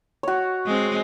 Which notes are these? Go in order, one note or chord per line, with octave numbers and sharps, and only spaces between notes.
F#4 C#5
G#3 C4